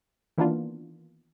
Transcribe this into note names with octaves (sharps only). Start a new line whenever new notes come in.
D#3 E3 A#3 B3 D4 F4